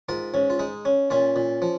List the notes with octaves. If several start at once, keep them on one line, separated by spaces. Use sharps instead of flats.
G#2 F4 A#4
G#2 C#4
F4
G#3 D#4
C#4
A#2 C#4 F4
A#2
F3